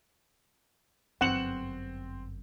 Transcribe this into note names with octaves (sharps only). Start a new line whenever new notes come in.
G1 F#2 C4 F#5 E7 F#7